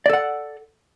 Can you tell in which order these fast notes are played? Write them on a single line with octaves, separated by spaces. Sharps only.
D5 A4 F#5